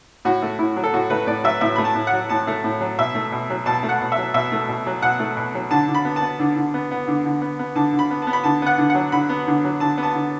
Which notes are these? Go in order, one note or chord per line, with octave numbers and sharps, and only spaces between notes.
A2 F#4
A3
A2 E4
F#3
A4
A2 F#4
A3 B4
A2 D5
F#3 E5
A2 E5
A3 B5
A5
A2
F#5
F#3
A2 A5
A3
A2
F#3
B2 E5
A3
B2
F#3
B2 A5
A3
F#5
B2
E5
F#3
B2 E5
A3
B2
F#3
B2 F#5
A3
B2
F#3
D3 A5
D3
B5
B3
A5
B3
D3
D3
B3
B3
D3
D3
B3
B3
D3 A5
D3
B5
B3
B3 A5
B5
D3 A5
B3 F#5
D3
F#5
F#3
D3 B5
B3
D3
F#3
D3 A5
B3
A5
D3